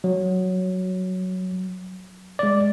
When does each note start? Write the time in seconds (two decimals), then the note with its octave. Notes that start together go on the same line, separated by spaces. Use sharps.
0.04 F#3
2.39 G#3 D5